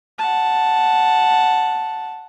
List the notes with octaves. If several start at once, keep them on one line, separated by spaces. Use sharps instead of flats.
F#5 A5